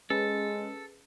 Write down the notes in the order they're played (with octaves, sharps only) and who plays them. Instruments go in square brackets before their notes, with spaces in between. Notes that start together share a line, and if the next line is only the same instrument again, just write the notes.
[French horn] G#3 [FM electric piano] C#4 G#4 B4 [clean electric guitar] A4